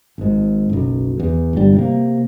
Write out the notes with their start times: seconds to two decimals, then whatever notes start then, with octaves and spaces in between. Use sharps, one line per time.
0.18 G#1 G#2
0.69 F#1 B1
1.19 E2
1.53 G1 G3
1.74 C3 A3 A#3